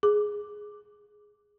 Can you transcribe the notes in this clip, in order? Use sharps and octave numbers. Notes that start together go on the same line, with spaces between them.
G#4 D6